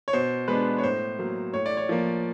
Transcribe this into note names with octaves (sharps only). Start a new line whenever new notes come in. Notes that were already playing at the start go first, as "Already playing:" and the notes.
C#5
B2 C5
G#3 B3 D4 B4
C#5
A2 C5
F#3 A#3
A2 C#5
D5
C#5
F3 A#3